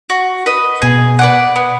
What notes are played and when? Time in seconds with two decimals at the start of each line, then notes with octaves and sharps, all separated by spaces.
0.10 F#4
0.46 B4 D#5
0.82 B2 G#4
1.19 B4 D5 F#5
1.56 B3